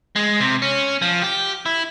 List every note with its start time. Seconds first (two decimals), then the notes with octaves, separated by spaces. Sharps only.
0.16 G#3
0.40 C3
0.62 C#4
1.02 F3
1.22 G4
1.66 E4